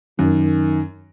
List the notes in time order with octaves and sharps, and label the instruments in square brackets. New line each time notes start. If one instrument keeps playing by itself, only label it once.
[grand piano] F#2 [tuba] D#3